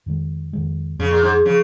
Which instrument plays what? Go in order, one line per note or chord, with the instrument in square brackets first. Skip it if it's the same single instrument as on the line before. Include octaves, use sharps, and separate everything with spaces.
[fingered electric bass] F2 D#3 G#3
F2 D#3 G#3
[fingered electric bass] F2 F3 C#4 [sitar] C#3
[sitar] A#2
G#2
[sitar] C#3 [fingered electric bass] F3 C#4